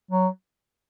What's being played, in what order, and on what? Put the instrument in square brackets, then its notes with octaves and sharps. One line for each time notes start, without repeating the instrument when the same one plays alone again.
[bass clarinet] F#3